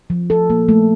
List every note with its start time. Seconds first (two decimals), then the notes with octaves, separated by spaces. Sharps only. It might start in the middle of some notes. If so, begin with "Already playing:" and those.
0.10 F3
0.30 A4
0.50 A#3
0.69 A3